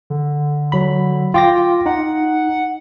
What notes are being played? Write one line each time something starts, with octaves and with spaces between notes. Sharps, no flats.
D3
F#3 B5
F4 G5 D6 A#6
D#4 F#5